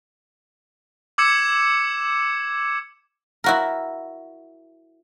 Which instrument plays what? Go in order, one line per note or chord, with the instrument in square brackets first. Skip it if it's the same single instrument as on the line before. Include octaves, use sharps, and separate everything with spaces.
[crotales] D6 E6 G#6 C#7 E7
[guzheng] E4 F#4 A#4